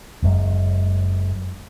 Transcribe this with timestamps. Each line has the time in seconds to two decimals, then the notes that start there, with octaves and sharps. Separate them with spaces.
0.23 F#1 F#2 G#3